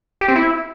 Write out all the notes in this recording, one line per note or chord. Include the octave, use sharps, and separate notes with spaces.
G4
C4
E4